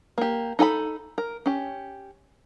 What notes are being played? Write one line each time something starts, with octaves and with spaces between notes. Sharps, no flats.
A#3 G4
D#4 A4 G#5 B5
A#4
C#4 G4